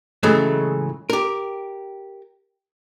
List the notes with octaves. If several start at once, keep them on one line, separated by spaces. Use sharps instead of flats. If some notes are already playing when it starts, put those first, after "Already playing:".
A2 C#3 E3 F#3 G#3 A3
G4 A#4